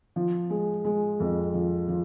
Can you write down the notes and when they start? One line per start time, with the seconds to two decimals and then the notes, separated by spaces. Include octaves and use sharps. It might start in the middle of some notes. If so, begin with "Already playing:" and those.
0.16 F3
0.50 G#3
0.85 G#3
1.20 F2
1.54 F3
1.88 F3